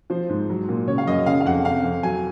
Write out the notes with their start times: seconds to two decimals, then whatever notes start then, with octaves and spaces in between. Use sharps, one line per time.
0.10 F3 C5
0.29 G#2
0.50 F#3
0.69 A#2
0.88 C#3 C#5
0.98 F5
1.07 F#2 D#5
1.26 C#3 F5
1.41 F5
1.45 F2 F#5
1.65 C3 F5
1.84 F2
2.03 F#3 G#5